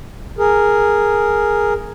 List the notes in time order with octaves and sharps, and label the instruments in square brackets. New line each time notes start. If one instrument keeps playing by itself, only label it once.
[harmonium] G#4 A#4